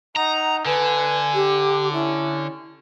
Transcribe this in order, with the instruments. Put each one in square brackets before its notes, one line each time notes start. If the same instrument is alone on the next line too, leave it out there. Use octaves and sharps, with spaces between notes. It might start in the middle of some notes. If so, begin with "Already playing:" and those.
[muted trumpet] D#4 [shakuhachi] F#5 [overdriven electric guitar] A#5
[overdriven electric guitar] D3 [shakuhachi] B4 [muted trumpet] G#5
[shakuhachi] G4
[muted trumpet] C#4 [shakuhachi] E4